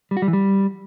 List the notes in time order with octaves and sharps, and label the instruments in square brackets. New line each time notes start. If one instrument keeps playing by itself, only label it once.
[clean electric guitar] G3
F#4
G3
E3
G3